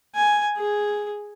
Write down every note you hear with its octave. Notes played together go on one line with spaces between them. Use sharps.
G#5
G#4